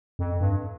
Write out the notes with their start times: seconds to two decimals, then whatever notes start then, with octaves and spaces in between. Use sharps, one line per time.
0.19 F2
0.41 G2